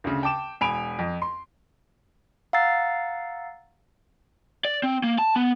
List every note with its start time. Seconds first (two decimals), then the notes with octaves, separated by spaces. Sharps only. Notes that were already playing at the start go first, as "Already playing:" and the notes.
0.04 D2 C#3
0.23 G5 A5 D6 E7
0.61 E1 G#5 B5 D7 F7
0.99 F2
1.22 C6
2.53 F5 F#5 A#5 E6 A6 C7
4.65 D5
4.83 C4
5.04 A#3
5.18 A5
5.36 B3